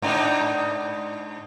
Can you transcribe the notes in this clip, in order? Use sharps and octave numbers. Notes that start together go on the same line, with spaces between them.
G#2 D4 D#4